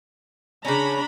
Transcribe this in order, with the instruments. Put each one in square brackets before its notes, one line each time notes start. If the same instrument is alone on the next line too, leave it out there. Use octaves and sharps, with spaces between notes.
[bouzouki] C#3 C#4 [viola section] D4 A#5 B5